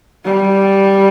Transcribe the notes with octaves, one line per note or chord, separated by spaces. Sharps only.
G3